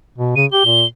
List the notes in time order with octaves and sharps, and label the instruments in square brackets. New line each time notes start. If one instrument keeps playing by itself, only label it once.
[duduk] B2
[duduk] C#3 [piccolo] D#7
[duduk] G4 [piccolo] G7
[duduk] A#2